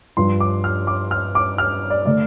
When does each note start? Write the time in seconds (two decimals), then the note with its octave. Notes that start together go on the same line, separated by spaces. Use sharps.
0.17 G2 F3 D4 C6
0.40 D6
0.64 F6
0.87 D6
1.11 F6
1.35 D6
1.58 F6
1.90 D5
2.05 D3 A3 D5